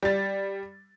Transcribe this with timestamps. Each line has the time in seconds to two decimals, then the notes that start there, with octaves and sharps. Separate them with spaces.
0.03 G3 A6